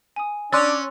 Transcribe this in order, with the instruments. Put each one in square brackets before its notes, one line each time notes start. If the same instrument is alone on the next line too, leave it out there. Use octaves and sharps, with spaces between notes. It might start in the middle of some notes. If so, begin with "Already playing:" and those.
[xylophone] G#5 D#6
[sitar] C#4 [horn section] D4 D5 [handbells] C6 A6 [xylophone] E6 F#6